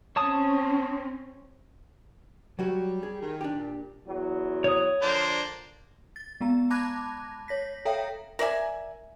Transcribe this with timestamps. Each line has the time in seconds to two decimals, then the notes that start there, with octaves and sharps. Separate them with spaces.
0.16 C4 C#4 C#5 A5 D#6
2.59 F#3 G3 F#4 C#5
3.03 G#4
3.22 D#3
3.41 D4 G4
3.56 A#2
4.07 E2 F#3
4.64 C#5 D#6
5.02 D3 F3 A#3 D4 C5
6.16 A6
6.41 G#3 B3 A#5
6.70 A5 B5 D6 F#6 G#6 A#6
7.48 C#5 A#6 B6
7.85 A4 C#5 E5 F5 G5 A#5
8.39 A#4 D5 E5 G#5